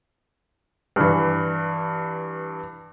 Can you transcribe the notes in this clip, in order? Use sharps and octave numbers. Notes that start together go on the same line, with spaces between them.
G2 E3